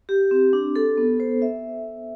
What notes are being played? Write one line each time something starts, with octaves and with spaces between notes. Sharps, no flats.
G4
C4
D4
A4
B3
C5
E5